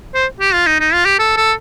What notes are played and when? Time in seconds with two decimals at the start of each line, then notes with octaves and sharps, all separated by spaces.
0.14 C5
0.40 G4
0.54 F4
0.66 D#4
0.80 D#4
0.93 F4
1.05 G4
1.19 A4
1.37 A4